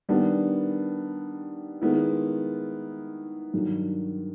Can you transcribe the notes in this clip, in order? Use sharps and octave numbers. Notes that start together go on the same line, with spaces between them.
D#3 G3 B3 D4
D#3 G#3 B3 E4
G2 D#3 F#3